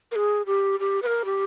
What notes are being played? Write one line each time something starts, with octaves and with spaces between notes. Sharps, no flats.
A#4
G#4
G4
G4
B4
A#4
G4